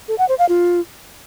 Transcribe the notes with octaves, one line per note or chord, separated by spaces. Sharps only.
A4
F#5
C5
F5
F4